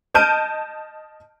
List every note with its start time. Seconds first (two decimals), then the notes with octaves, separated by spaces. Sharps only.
0.14 D#5 A5 F6 G6 D7 D#7